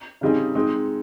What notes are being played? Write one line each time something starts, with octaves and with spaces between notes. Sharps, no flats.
C#3 G3 C4 D#4 G#4
G#3 C4 D#4